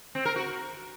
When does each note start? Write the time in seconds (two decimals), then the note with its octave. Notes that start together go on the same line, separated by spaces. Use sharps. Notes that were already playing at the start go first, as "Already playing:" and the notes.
0.15 C4
0.25 A#4
0.36 F#4